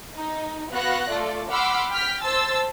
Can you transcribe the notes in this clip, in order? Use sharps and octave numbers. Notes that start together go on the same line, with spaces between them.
D#4
B3 F#4 F5 F#5 F#6 A#6
A3 F4 A4 D5
F#5 B5 C6 D6 E6 F6
G5 F6 B6
C5 A5 C6 E6 A6